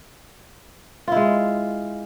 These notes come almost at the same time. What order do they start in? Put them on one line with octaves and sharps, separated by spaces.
F4 E4 G#3